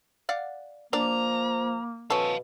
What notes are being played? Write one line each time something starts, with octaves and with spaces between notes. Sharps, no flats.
D5 F5 F#5
F3 A#3 D4 D5 A#5
B2 C#4 A4 F5 A5